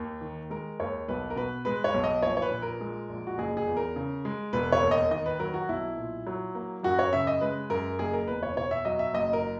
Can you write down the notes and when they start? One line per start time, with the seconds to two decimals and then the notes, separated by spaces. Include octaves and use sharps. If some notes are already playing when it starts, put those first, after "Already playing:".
Already playing: D#2
0.21 D#3
0.50 G#3 A#4
0.80 D#2 C#5
1.08 B1 B4
1.30 A#4
1.36 B2 B4
1.65 G#3 B4
1.84 C#5
1.94 B1
2.04 D#5
2.23 A#1 C#5
2.37 C#5
2.42 B4
2.52 A#2
2.62 A#4
2.81 G#3
3.09 A#1
3.27 F#4
3.38 F#1 G#4
3.57 G#4
3.68 E2
3.77 A#4
3.96 C#3
4.25 G#3
4.53 E1 B4
4.72 C#5
4.83 D#2
4.91 D#5
5.11 D#3 D#5
5.26 B4
5.39 F#3 A#4
5.54 F#4
5.69 B1 E4
5.98 A#2
6.27 F#3
6.55 A#3
6.83 F#2 F#4
6.99 C#5
7.13 C#3 E5
7.27 D#5
7.41 G#3 B4
7.70 F#2 A#4
7.99 F#1 G#4
8.13 A#4
8.27 E2 B4
8.43 C#5
8.56 B2 C#5
8.71 E5
8.85 F#3 D#5
8.99 E5
9.14 F#1 D#5
9.33 A#4